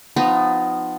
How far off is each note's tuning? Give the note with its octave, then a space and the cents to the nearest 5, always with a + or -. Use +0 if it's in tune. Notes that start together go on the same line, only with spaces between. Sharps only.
F3 +15 B3 +30 D#4 -10